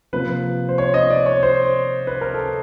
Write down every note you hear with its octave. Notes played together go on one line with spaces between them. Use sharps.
C3 F3 A#3 B4
C5
C#5
D#5
D5
C#5
C5
B4
A#4
A4